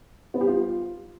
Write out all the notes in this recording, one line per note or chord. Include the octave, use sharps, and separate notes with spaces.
B3
G4
F4